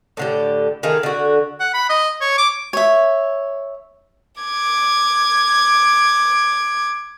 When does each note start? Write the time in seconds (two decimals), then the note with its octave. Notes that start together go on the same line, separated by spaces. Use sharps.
0.17 A2 D3 G4
0.83 D#3 A3 G#4 F5
1.03 D3 F#4
1.60 F#5
1.74 B5
1.90 D#5
2.21 C#5
2.38 D6
2.73 C#5 E5
4.41 D6 G#6